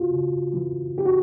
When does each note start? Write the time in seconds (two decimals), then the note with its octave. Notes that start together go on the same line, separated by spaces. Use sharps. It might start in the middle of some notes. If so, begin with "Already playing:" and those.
Already playing: C#3 F4 F#4
0.10 C#3
0.54 E3
0.97 E3 G4
1.05 F#4